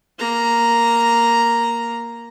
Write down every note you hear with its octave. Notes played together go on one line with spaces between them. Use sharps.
A#3 A#5